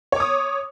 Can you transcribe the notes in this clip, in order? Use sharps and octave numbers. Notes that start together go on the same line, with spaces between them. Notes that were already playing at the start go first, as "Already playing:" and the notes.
C#5 D6 D#6